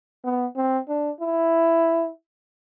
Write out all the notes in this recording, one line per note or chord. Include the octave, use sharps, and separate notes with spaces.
B3
C4
D4
E4